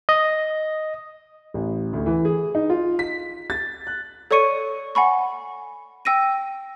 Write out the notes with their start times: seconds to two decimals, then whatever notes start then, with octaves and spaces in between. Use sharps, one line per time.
0.09 D#5
1.54 A1
1.93 D2
2.06 E3
2.25 G#4
2.55 D#4
2.70 F4
2.99 B6
3.50 A6
3.87 F#6
4.31 A4 C#5 D5 C#6 C#7 D#7
4.95 F#5 G#5 B5 C#6
6.05 G5 E6 A#6 D#7